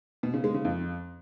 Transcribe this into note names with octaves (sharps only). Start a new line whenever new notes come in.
B2
C#3
G#3
C#3
F2